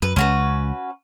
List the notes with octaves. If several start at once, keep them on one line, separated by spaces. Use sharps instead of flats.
F#2 B4
C#2 C#4 F#4 B4